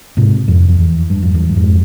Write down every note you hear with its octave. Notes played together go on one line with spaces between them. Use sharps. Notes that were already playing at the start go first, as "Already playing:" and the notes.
G#2 C3
F2
F2
E2
G2
F2
E2 G2
G2
F2 G#2